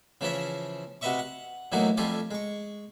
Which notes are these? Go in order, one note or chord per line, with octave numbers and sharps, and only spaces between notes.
C#3 E3 F3 C#4 E5
C3 F#4 B4 D#5 E5 C#6
F#5
A2 E3 F#3 A#3 B3 D#4
F2 G3 A3 F4 G#5 D6
G#3 C#6